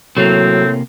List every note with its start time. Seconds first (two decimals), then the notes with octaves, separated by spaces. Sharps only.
0.17 A2 C3 F#3 A#3 C4